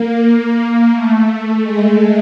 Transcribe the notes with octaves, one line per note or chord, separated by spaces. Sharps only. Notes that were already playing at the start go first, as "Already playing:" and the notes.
Already playing: A#3
A3
G#3